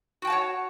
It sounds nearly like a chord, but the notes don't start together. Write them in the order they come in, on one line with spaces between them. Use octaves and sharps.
F#4 G5 A5 F#5 C#5